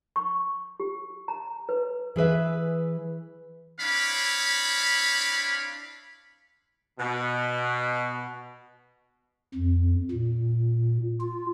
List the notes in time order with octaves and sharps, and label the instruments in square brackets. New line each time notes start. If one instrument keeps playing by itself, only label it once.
[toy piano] C#6
G4
A#5
B4
[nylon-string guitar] E3 G#4 B4 E5
[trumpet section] C4 D4 E4 C#5 F5 B5
[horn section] B2
[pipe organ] F2
A#2
F4